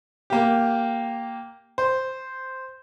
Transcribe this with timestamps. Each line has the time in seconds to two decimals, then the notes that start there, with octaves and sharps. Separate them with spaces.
0.30 A#3 G4
1.78 C5